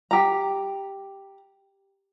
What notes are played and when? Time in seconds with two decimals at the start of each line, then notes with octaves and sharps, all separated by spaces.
0.11 G4 A#5